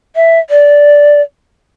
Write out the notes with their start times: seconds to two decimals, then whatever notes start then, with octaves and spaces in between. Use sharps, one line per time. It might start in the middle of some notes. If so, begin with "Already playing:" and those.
0.16 E5
0.50 D5